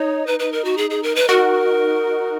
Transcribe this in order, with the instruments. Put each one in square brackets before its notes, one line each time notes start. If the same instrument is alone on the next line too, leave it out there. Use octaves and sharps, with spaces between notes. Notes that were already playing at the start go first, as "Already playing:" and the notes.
Already playing: [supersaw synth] D#4 [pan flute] C#5
[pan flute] B4
B4
A#4
F#4
G#4
G#4
A#4
B4
[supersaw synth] F#4 [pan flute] A#4